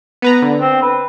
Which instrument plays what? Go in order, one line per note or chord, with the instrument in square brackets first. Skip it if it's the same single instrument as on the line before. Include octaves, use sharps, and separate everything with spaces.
[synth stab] B3 B4 A#5
D3
[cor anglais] C4
B4